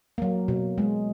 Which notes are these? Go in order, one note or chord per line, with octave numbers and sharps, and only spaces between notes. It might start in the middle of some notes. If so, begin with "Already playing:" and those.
F#3 A#3
B2
G#3